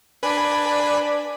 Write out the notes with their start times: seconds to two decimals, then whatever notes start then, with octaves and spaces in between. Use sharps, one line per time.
0.23 D4 B4 G#5 B5